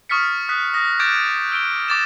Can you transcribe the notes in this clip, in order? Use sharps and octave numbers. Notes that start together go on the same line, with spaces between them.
C#6 D#6 F6 A6 B6 C#7
D#6 F#6 B6
D#6 A#6
D6 G6 A6 D7 E7
E6 D7 G7
D6 A6 E7